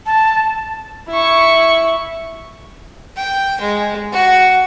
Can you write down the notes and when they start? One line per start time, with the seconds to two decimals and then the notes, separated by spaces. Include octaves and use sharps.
0.06 A5
1.09 E4 C#6
3.16 G5
3.61 G#3
4.12 F#4